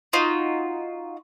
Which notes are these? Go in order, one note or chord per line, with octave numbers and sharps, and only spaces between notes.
D#4 F4 F#4